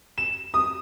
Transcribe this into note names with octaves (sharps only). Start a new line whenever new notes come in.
E7
D#6